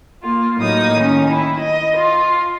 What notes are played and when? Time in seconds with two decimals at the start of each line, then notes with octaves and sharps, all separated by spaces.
0.23 A#3 F4
0.57 A2 F#3 A#3 D#4 D#6
0.97 D#3 C#4
1.31 E4
1.60 D#5
1.97 F4